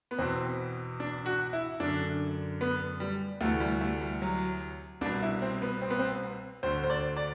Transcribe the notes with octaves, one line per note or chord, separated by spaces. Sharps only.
B3
E2 B2 C4
D4
F#4
E4
F#2 D3 D4
B3
G3
D2 C3 E3 A3
G3
A3
G3
F#3
C2 B2 D4
E4
C4
B3
C4
B3
C4
D2 D3 C5
C5
D5
D5